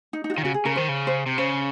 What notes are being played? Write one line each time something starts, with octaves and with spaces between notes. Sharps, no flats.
D#4
D#4
F#4
D#3 F4
C#3 F#4
G#4
C#3 A#4
D#3 C5
C#3
C5
C3
C#3 C5